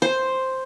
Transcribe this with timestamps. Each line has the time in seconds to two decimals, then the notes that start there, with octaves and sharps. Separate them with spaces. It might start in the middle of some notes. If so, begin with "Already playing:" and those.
0.02 C5